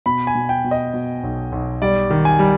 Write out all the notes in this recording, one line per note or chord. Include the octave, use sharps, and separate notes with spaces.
B2 B5
G#5
B2
G5
B2
D#5
B2
B1
B1
G3 D5
D#3
G#5
G3